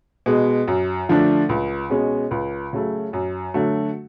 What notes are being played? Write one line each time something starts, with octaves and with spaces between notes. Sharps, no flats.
B2 G#3
F#2
D3 F3 A3 D4
C#2
B2 G#3 C#4
C#2
C#3 F#3 A3
F#2
D3 F#3 A3